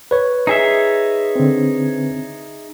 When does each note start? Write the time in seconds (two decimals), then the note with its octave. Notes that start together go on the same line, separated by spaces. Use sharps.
0.11 B4 C#5
0.47 D#4 G#4 E5
1.36 D3 C4